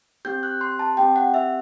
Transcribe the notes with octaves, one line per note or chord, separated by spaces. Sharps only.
C4 G4 G6
F#6
C6
A5
C4 G4 G5
F#5
E5